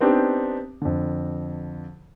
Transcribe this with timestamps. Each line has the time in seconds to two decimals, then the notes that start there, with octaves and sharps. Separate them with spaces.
0.01 B3 C4 D4 D#4 G4
0.82 F2 D3